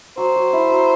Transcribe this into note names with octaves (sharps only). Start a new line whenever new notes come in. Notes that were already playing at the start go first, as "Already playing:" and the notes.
F#3 C5
F#3
E4
F#3